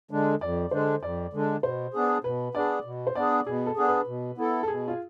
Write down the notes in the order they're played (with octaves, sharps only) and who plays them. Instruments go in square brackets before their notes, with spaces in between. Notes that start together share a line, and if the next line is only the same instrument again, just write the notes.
[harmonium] D3 G#3 D4
[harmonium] F2 [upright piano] D5
[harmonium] D3 G#3 D4 [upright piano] C5
[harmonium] F2 [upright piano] D5
[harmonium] D3 G#3 D4
[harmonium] B2 [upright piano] C5
[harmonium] B3 D4 G#4
[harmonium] B2 [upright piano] B4
[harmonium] B3 D4 G#4 [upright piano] D5
[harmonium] B2
[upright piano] C5
[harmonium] B3 D4 G#4 [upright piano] D5
[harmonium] B2 [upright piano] G#4
[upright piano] A4
[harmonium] B3 D4 G#4
[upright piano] B4
[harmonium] B2
B3 E4 A4
[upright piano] A4
[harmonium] B2 [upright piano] G#4
[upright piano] F4